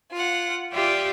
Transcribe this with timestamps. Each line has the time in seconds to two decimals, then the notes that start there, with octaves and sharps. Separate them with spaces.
0.11 F4 F#5
0.72 F4 G4 D5 E5 G5